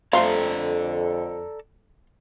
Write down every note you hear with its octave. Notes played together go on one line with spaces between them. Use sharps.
F2 A3 A4 C5 D5 F5 A#5